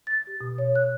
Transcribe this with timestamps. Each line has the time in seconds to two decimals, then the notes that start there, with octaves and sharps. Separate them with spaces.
0.07 A6
0.27 G4
0.41 B2
0.58 C#5
0.76 F#6